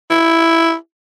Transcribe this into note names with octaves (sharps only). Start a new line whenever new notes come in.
E4